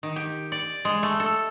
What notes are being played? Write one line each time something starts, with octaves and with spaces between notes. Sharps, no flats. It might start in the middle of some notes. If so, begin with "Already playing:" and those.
D#3
G4
D5
G#3
A3
A4